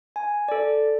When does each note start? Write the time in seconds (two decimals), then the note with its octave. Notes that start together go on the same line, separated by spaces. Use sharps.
0.16 G#5
0.48 A4 D5